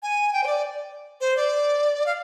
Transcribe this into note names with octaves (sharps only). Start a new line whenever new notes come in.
G#5
G5
C5
D5
C5
D5
F5